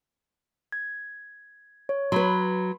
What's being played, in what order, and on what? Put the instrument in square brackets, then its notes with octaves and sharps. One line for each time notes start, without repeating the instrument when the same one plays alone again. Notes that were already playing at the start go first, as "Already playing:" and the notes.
[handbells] G#6
C#5
[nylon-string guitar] F#3 B4 [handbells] B5 C6